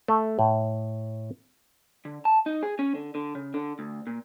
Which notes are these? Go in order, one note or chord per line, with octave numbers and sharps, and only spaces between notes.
A3
A2
D3
A5
D#4
G#4
C#4
D3
D3
C#3
D3
D2
A#2